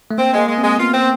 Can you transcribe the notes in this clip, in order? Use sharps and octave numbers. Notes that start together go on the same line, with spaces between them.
A3
A#3 C4
G#3
A#3
G#3
C4
G#3
B3 F4
C4